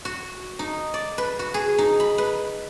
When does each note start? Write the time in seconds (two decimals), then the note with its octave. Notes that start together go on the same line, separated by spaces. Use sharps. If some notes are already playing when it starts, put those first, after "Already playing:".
0.05 F#4
0.59 D#4
0.94 D5
1.18 B4
1.39 F#4
1.54 G#4
1.78 D#4
2.00 B5
2.18 B4